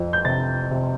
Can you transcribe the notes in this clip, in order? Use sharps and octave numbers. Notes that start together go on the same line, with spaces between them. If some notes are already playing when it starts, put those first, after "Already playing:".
Already playing: F2 F3
G6
C3 A6
C3